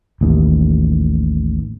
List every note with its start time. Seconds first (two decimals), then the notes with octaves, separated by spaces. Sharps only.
0.21 A1 D#2